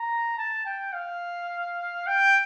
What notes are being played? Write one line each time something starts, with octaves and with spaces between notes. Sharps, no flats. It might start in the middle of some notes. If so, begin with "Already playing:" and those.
Already playing: A#5
A5
G5
F5
G5